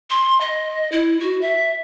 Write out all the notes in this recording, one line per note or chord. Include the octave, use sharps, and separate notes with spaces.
C6
D#5
E4
F#4
E5